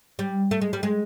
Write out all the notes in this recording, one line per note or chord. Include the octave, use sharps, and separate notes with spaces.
G3
A3
G#3
G3
G#3